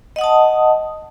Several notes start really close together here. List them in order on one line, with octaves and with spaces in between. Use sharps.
D#5 F#5 D#6 A5